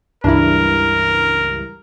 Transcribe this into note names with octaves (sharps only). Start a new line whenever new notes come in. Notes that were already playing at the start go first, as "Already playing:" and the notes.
C#2 G2 E3 D4 E4 A#4